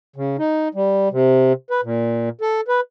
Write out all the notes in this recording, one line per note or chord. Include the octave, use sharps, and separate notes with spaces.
C#3
D#4
G3
C3
B4
A#2
A4
B4